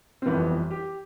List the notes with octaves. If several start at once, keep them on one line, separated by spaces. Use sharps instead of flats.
C4
G1 F2 E3 G3 B3
G4